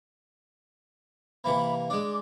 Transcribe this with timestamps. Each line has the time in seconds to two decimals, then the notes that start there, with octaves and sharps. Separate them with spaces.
1.44 C3 E3 A#3 B5
1.90 G#3 D4 D6